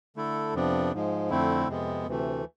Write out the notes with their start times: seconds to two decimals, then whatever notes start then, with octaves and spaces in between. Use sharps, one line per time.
0.16 D3 A3 E4 A4
0.54 F2 C3 F3 B3 D4
0.93 G#2 F3 G#3
1.30 F2 D3 A3 C4 E4
1.68 F2 C3 G#3 B3
2.06 D2 C3 E3 A3